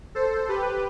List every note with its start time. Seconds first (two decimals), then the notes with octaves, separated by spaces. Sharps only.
0.15 A4 C5
0.49 G4 B4